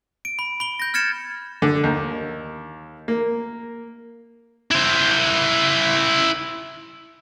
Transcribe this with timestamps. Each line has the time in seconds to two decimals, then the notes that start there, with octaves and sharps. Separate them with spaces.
0.25 D7
0.39 B5
0.60 B5 G7
0.79 G6 A#6
0.94 F6 G#6 A6 C#7 E7
1.62 D3
1.84 D#2
3.08 A#3
4.71 E4 C5